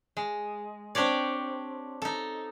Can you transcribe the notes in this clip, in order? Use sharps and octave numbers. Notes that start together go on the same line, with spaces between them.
G#3
C4 D4 G4 C#5 D5
D#4 A4